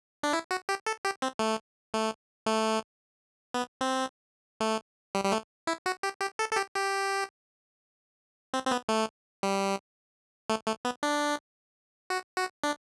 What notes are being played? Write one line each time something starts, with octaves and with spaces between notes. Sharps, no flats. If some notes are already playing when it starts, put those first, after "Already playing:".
D4
E4
F#4
G4
A4
G4
C4
A3
A3
A3
B3
C4
A3
G3
G3
A3
E4
F#4
G4
G4
A4
A4
G4
G4
C4
C4
B3
A3
G3
A3
A3
B3
D4
F#4
F#4
D4